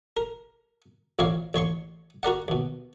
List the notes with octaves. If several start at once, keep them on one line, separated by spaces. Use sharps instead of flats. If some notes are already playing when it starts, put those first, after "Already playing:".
A#4
A1 A#2 A#3 C4 C#5 F5
A1 C#5 C6 C#6
F#4 A#4 D5 F#5
D#2 B2